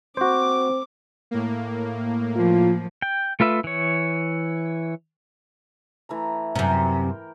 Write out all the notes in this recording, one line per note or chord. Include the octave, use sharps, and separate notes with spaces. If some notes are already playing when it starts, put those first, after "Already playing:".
C4 F#4 C5 D6
A2 A#3
F3 F4
G5
A3 F4 B4 E5
E3 C#5
E3 A3 A#5
F#2 C3 A#4 G5